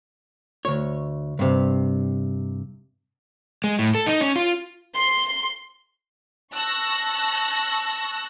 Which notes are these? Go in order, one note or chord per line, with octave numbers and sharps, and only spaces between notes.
D2 C#5
G2 C3
G#3
A2
A4
D#4
C#4
F4
C6
A5 C#6 E6 F#6 A#6